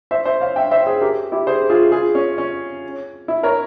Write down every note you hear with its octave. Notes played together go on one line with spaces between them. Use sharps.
C5 E5
C5 E5
C#5 F5
E5 G5
C5 E5
G#4 C5
G4 A#4
E4 G4
G#4 C5
F4 G#4
F4 G#4
C#4
C#4
E4
A#4 C#5